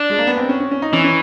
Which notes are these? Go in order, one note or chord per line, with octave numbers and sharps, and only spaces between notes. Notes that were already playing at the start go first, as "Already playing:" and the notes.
Already playing: D4
G#3
A#3
B3
C4
C#4
C#4
C#4
D#4
E3 C#4
C#4